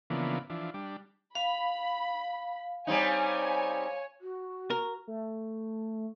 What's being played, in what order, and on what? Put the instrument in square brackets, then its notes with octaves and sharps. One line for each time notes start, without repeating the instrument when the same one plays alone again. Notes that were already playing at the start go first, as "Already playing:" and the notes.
[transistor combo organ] C#3 E3 F3 A#3 B3 D4
E3 F3 D4
G3 D4
[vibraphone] F5 [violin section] B5
[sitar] G3 C4 D#4 [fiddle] C#5 [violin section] G#5
[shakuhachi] F#4
[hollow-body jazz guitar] A#4
[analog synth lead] A3